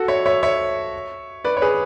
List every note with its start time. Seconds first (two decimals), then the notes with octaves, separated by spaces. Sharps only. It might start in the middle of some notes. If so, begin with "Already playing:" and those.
Already playing: F#4 A4
0.08 C#5 E5
0.26 C#5 E5
0.43 C#5 E5
1.44 B4 D5
1.57 C#5
1.62 G#4 B4